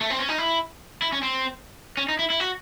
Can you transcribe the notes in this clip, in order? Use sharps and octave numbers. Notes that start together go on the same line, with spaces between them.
A3
C4
C#4
D#4
E4
E4
C#4
C4
C#4
D#4
E4
E4
F#4